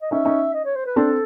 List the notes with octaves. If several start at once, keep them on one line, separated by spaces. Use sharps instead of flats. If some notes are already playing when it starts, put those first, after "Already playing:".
D#5
C#4 D#4 E5
C#4 D#4
D#5
C#5
C5
B4
C4 D4 A4